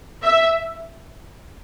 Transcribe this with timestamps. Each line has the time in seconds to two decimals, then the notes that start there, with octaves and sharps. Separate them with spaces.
0.23 E5